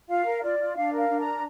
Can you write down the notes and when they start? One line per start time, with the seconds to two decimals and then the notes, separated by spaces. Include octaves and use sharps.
0.09 F4 F5
0.26 A#4
0.42 F4 D5
0.59 F4
0.76 D4 F5
0.93 A#4 F5
1.09 D4
1.20 A#5
1.26 A#4